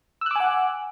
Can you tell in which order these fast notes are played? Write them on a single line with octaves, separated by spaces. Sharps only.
E6 F#6 D6 G#5 F#5